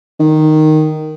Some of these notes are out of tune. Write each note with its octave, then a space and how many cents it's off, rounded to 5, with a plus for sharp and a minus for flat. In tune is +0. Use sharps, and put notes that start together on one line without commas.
D#3 -5